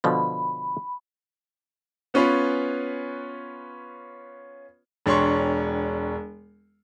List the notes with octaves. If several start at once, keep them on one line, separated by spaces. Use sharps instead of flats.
B2 D3 F3 B5
B3 C#4 F4 B4 C#5
E1 D4 C#5 C6 C#6